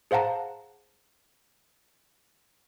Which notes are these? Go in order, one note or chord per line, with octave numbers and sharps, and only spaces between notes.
G#4 C5 F5 F#5 A5 A#5